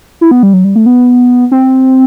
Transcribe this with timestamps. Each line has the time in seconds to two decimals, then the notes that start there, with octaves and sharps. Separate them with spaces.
0.21 E4
0.31 B3
0.43 G3
0.53 F#3
0.64 G3
0.76 A3
0.86 B3
1.52 C4